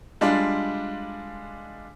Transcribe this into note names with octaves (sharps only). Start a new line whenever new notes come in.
G3 G#3 D4 F4 D5